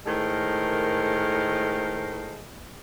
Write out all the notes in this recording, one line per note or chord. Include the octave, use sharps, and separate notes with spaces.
A2 D#3 G#3 A4 A#4 C5